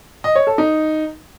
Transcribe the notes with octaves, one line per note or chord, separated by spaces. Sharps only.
D#5
C#5
A4
D#4